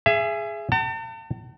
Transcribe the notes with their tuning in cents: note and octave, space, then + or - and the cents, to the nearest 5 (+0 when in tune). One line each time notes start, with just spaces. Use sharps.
G#4 +0 E5 +30
F#5 +45 A5 +40